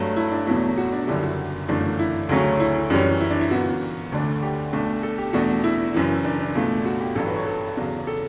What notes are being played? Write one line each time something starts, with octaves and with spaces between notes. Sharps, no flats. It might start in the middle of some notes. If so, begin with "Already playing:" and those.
Already playing: G2 F#3 A3
E4
D4
E2 B2 F#3 A3 E4
F#4
D4
F#1 F#2 D3 G3 E4
F#4
G1 F#2 E3 A3 D4
E4
D2 C#3 F#3 A3 C#4
E4
F#2 E3 G3 C#4
E4
D4
E4
G1 F#2 E3 B3 F#4
D2 D3 A3 D4
G4
B1 B2 A3 D4
A4
G4
E2 B2 A3 D4 F#4
E4
F#1 F#2 E3
D4
D4
C#2 B2 A3
F#4
G4
A1 G2 F#3 A4
B4
C#5
A4
E2 C#3 F#3
A4